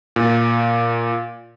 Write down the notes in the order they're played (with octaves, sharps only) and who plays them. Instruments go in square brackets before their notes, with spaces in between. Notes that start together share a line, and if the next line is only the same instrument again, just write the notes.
[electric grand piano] A#2